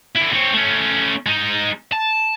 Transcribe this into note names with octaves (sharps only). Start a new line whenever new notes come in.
D3 E4
C4 C#5
A3 C#4
G#3 D#4
A5